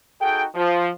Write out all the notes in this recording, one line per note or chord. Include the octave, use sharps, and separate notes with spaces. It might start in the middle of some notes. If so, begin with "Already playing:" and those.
D#4 F#4 G#4 A4 G5
F3